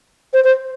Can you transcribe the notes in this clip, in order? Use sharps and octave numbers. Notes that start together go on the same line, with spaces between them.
C5
C5